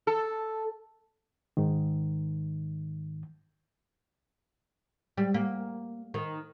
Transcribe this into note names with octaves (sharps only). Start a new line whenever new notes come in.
A4
G#2 D#3
G3
A#3
D#3